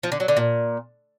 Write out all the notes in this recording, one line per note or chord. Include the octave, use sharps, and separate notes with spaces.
F3
D3
F#3
D3
A#2